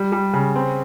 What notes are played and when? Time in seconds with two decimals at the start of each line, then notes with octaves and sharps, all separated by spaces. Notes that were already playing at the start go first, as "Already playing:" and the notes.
Already playing: G3
0.12 G3
0.33 C#3
0.55 C4